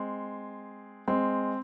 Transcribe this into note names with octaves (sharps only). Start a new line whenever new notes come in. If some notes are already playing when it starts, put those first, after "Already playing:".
Already playing: G#3 C4
G#3 C4